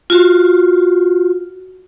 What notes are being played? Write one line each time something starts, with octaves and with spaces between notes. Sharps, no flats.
F4 F#4